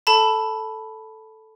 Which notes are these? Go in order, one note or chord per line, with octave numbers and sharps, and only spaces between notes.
A4 A5 B5